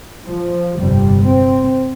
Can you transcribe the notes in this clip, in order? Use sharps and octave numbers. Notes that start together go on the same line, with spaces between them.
F3
G1 F2 C3 G3
C4